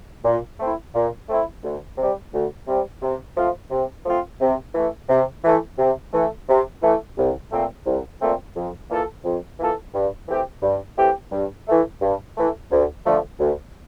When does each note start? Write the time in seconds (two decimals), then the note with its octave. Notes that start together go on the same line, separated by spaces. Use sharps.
0.25 A#2
0.60 A3 C4 E4
0.95 A#2
1.28 A3 C4 E4
1.63 D2
1.98 C3 G3
2.33 D2
2.67 C3 G3
3.02 C3
3.37 F3 A3 C4 F4
3.71 C3
4.06 F3 A3 C4 F4
4.41 C3
4.75 E3 A3
5.09 C3
5.44 E3 A3
5.79 C3
6.13 E3 A3
6.49 C3
6.83 E3 A3
7.18 C2
7.52 A#2 A3 C4
7.86 C2
8.21 A#2 A3 C4
8.56 F2
8.90 E3 A#3 F4 A4
9.24 F2
9.60 E3 A#3 F4 A4
9.94 G2
10.28 E3 A3 C4 G4
10.63 G2
10.98 E3 A3 C4 G4
11.32 G2
11.67 E3 A3
12.02 G2
12.36 E3 A3
12.71 D2
13.05 D3 F3 A3
13.39 D2